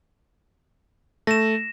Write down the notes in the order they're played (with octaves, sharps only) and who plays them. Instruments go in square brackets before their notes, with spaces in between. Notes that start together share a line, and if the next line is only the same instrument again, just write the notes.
[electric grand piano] A3 [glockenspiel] A#6 E7